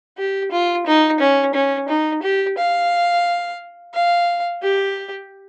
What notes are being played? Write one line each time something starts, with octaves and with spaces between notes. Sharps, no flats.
G4
F4
D#4
C#4
C#4
D#4
G4
F5
F5
G4